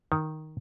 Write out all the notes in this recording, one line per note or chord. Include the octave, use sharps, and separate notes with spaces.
D#3